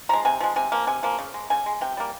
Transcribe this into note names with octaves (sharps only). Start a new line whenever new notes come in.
F3 G#3 A#5
C3 G#5
F3 G#3
C3 G#5
F3 A#3
C3 G#5
F3 A#3
C#3
G#3
C#3 G#5
G#3
C3 G5
G3 A#3